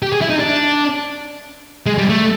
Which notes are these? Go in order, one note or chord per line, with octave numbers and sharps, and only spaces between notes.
G4
G#4
E4
D#4
D4
G#3
G3
A3